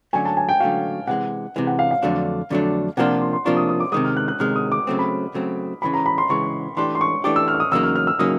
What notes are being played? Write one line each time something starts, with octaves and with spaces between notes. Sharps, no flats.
D3 F#3 A3 C#4 F#4 G#5
A5
G#5
G5
D3 F#3 A3 C#4 F#4 F5
C3 E3 G#3 F#5
C3 E3 G#3
F#5
F5
F5
F2 D3 F#3 A3 D4
F2 D3 F#3 A3 D4
C3 F3 A#3 D4 F4 F#5
C6
C6
C3 F3 A#3 D4 F4 C#6
D#6
D#6
D6
C3 D#3 G#3 D#6
F6
F#6
F#6
C3 D#3 G#3 F6
D#6
D6
C#3 F#3 A3 C4
B5
C#3 F#3 A3 C4
C#2 C#3 E3 G#3 B5
A#5
B5
C6
C#2 C#3 E3 G#3 C#6
E3 A3 D4 G4 C6
C6
C#6
E3 A3 D4 G4 D6
E6
F6
E6
D#6
E2 C#3 F#3 A#3 D#4 E6
F6
F6
E6
C#3 F#3 A#3 D#4 D#6